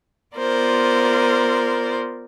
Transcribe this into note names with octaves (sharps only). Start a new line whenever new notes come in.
B3 F4 A#4 C5 D5